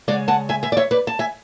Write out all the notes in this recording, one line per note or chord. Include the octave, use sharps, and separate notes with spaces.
C#3 G#3 C#4 D5 F#5
F#5 A5
E5 G#5
E5 G#5
D5
C#5 E5
B4 D5
A5
E5 G#5